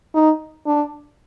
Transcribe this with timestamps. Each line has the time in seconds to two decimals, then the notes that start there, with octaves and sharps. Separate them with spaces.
0.14 D#4
0.66 D4